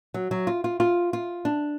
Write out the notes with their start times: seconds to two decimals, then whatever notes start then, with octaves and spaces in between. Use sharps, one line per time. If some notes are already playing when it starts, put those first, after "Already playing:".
0.14 F#3
0.31 F#3
0.47 F4
0.64 F4
0.80 F4
1.13 F4
1.45 D4